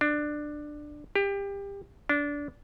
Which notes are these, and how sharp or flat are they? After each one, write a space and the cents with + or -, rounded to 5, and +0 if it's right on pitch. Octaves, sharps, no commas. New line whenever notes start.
D4 +15
G4 +25
D4 -20